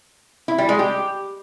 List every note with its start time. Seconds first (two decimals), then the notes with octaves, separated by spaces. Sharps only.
0.48 E4
0.58 G3
0.69 G#3
0.79 G4